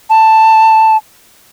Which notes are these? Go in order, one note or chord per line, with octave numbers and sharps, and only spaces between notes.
A5